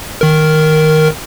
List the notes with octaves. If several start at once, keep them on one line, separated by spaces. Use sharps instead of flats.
D#3 A#4